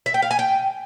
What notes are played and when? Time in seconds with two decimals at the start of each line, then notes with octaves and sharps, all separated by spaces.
0.06 E5
0.14 G5
0.22 F5
0.31 G#5
0.39 G5